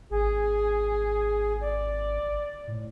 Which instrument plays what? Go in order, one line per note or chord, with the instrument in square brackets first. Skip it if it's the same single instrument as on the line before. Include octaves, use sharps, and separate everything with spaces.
[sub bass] G#1 [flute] G#4
[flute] D5
[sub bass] A2